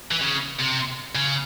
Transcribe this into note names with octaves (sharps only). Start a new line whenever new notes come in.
E3
C#3
C3
C#3